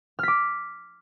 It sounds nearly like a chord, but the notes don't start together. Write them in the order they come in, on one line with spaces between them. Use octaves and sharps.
F6 B6 D6